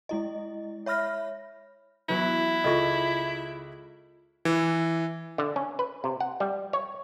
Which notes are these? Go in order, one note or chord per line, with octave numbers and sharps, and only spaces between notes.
G#3 E4 D#5
C#5 E5 B5 F6 A#6
E3 F#3 B3 E4
C#2 F4 A4 D#5 C#6
E3
D3
C#4
B4
C3
F#5
G3
C#5